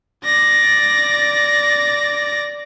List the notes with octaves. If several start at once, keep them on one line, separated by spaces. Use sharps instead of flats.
D5 A#6